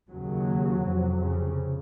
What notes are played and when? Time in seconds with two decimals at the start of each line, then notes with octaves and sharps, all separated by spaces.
0.09 D#2 C#3 F#3
0.83 F2 C3
1.19 C#3